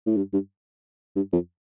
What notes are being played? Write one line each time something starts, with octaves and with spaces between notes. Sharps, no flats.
A2
G2
G2
G2
F2